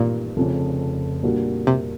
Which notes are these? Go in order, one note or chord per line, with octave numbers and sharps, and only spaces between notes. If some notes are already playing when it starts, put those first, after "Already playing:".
Already playing: A1 G2 A#2 D#3 G3 C4
F1 F2 C#3
A#2 G3 A#3 D4 F#4
C3